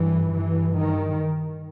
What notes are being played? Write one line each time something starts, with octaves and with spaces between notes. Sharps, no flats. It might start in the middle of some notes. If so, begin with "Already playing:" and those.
Already playing: G2 E3
G2 E3
D#3